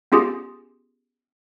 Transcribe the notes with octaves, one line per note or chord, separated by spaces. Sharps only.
B3 C#4 F4 G4 G#4